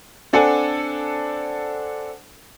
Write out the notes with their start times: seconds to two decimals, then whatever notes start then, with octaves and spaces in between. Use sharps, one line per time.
0.33 C4 D4 A4 F#5 G#5